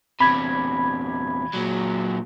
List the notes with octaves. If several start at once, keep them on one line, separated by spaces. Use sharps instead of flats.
E2 C3 B5 G#6
A#2 F#3